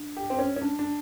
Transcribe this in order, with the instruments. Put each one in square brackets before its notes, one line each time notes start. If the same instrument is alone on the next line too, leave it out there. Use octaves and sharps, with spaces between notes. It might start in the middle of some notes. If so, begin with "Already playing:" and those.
Already playing: [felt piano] D4
[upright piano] G4
C4
C#4
C#4
D4
D4